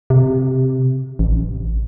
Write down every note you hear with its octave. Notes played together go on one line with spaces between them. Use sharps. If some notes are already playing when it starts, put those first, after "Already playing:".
C3
A1